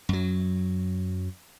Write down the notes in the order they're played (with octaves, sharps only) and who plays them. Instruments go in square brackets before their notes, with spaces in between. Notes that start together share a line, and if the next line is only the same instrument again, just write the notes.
[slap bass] F#2 F#3